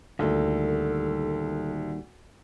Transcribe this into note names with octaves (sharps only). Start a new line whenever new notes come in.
D2 A#2 D#3 G3 A4